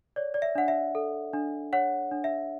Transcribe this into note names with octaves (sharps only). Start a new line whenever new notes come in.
C#5 D5
D5
E5
D4 F#5
E5
A4
D4
C#5 F#5
D4
E5